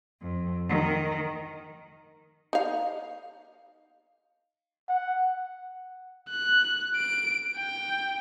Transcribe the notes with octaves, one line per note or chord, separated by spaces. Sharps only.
F2
D#3
D#4 F5
F#5
F#6
D7
G5